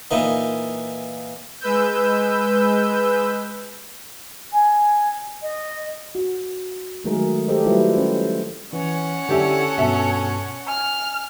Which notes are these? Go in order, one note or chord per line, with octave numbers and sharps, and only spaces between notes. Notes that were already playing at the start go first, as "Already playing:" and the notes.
A#2 E3 D#4
G#3 B4 E6 G6
G#5
D#5
F#4
D#3 F#3 G#3 A3 G#4 A#4
G4 A4 C5 D#5
F#3 G3 A3 E4 F4 B4
C#4 C5
E3 C#4 F#5
D3 E4 G4 A4 D5
G2 B2 E5
G#5 F6